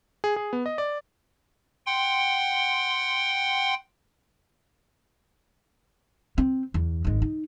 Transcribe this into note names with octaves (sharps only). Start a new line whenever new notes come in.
G#4
G#4
B3
D#5
D5
F#5 G5 C6
C4
E2
G#1 G#3
D#4